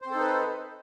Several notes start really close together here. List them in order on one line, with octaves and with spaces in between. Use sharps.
C5 C4 A4 D#4 B4